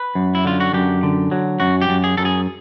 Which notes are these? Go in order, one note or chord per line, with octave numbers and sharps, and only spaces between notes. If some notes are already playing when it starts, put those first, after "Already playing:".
Already playing: B4
F#2
E4
D3 F4
F#4
F#2 G4
D3
F#3
F#2 F#4
G4
F#2
G#4
F#2 A4
G#4